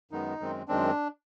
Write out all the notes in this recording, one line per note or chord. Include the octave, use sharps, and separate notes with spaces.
F#2 D#3 G#3 B3 D#4
F#2 D#3 G#3 C4
F#2 D#3 G#3 C4 D4